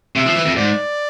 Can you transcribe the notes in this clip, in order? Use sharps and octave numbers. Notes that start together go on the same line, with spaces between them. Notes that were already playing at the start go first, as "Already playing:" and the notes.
C3 E5
F3
E3
F2
G#2 D5